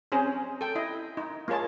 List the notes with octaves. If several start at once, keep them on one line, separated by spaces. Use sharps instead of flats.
C4 C#4 G#4 C5 A#5
A4 G5
E4 D#5
D#4
A#3 F4 G#4 C#5 A5